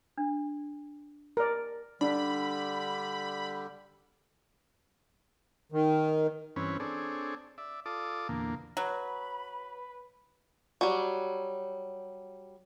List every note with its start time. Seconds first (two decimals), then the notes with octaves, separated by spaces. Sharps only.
0.18 D4
1.37 A#4 D5
2.01 D3 G3 D4 B5
5.72 D#3
6.56 G2 E3 C4 C#4 B4 C#5
6.80 C4 D4 G#4 A4 C#5 D5
7.58 D5 E5
7.86 F4 A4 D5 D6 D#6
8.29 E2 A#2 D3 A#3
8.77 F#3 B4 B5
10.81 F#3 G3